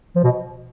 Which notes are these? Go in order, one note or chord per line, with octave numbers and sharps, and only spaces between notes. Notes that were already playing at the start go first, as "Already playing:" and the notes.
F3
B2